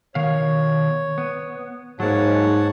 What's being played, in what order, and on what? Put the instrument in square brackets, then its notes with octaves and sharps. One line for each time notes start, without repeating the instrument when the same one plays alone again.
[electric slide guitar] B2 D#3 F5 [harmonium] C#5
[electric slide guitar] B3
[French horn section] G#2 [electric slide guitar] F#3 A#3 [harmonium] C#5 F#5 A5